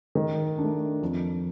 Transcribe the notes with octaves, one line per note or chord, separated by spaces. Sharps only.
D#3
D4
A3
F2